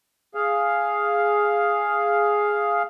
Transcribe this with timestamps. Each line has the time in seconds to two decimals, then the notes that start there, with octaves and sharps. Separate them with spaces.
0.35 G#4 F5